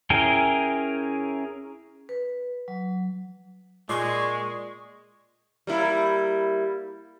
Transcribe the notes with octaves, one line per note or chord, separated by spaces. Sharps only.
C#4 E4 G#4 A#4 G5
B4
F#3
A#2 G#3 G#4 D5 C6 C#6
G3 A#3 E4